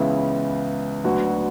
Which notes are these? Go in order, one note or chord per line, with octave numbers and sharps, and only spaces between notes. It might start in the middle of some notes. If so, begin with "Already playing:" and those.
Already playing: C#2 C#3 E3 B3 E4
D2 D3 F#3 B3 F#4